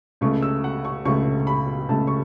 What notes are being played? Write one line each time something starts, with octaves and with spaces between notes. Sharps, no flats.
C#2 C#3 A3 C#6
E6
F#5
C#6
C#2 C#3 A3 C#6
B5
C#2 C#3 A3 A5
C#6